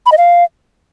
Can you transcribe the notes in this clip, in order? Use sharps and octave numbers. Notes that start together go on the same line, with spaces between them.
B5
D#5
F5